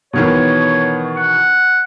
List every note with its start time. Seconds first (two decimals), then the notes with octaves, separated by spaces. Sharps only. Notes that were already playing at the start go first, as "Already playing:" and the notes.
0.13 B2 D#3 E3 C#5
1.16 F#5